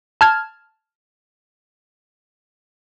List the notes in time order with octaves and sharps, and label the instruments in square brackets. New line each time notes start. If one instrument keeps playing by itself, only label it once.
[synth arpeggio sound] A5 F6 G#6